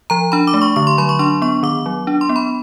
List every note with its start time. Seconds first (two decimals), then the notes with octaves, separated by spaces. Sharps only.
0.10 F3 A#5
0.32 D4 B5
0.47 D6
0.54 A3
0.62 C#6
0.76 D3 C#6
0.87 C6
0.98 F#3 B5
1.09 C#6
1.19 D4 C6
1.42 B3 C#6
1.63 D#3 D6
1.86 F#3
2.07 D4
2.21 C6
2.29 B3
2.36 B5